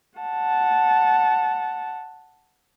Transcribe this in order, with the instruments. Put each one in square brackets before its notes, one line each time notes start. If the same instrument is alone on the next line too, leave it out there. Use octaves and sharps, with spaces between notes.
[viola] F#5 A5